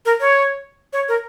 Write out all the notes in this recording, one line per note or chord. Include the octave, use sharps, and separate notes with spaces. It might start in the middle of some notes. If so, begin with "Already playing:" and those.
A#4
C#5
C#5
A#4